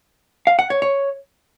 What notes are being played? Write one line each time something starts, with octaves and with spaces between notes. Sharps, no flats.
F5
F#5
C#5
C#5